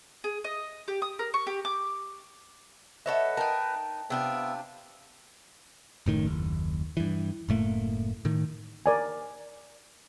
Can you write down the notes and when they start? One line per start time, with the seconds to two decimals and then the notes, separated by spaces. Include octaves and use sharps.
0.24 G#4
0.44 D#5
0.88 G4
1.02 D#6
1.19 A#4
1.34 C#6
1.47 G4
1.65 D6
3.06 A4 B4 C#5 D#5 E5 F#5
3.37 D#4 A#4 G5 A5
4.10 C3 B3 D4 F4 E5 G5
6.06 F#1 A2 D#3
6.26 F#1 D#2
6.97 G2 E3
7.49 F#1 A2 A3 A#3
8.25 A2 D#3
8.86 A#4 D5 G#5